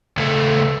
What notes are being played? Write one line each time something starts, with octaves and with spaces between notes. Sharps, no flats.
C#2 A3